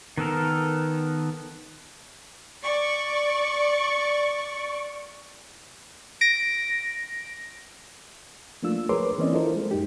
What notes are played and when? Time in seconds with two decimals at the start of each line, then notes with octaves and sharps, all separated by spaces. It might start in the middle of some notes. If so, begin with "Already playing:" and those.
0.17 D#3 B3 A4 A#4
2.63 D5 C#6
6.21 A#6 D7
8.63 F3 A3 A#3 D4 F4 E6
8.89 G#4 A#4 B4 C#5 C6 D6
9.18 E3 A#3 C4 C#4 D5 D#5
9.33 D4 E4 F4 A4 A#4 C5
9.56 G#3
9.71 F#2 D#4 G4